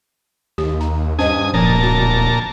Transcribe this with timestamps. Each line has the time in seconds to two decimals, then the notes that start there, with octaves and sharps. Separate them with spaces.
0.58 D#2 G4
0.81 A#5
1.19 G2 C#4 C5 D#5 G#5 D#6
1.54 D1 A#2 F3 A5 A#5
1.83 F#4